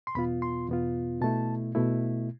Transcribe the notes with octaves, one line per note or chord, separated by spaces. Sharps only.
C6
E2 B2 B3 F4 B5
C6
E2 B2 B3 F4
B2 A3 E4 A5
B2 A3 E4